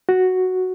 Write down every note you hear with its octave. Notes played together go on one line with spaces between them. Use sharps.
F#4